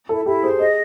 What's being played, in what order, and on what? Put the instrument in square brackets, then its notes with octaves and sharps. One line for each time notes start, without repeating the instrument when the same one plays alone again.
[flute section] E4 [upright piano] A4
[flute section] E4 [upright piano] G4
[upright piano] G#4 [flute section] C5
[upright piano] G#4 [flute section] D#5